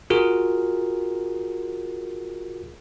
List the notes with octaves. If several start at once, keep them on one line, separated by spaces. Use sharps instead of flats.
F4 F#4 G#4 A#4